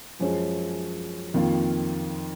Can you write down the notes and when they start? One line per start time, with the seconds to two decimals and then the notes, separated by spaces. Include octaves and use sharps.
0.20 F#2 F3 G#3 C#4
1.34 F2 D#3 A#3 F4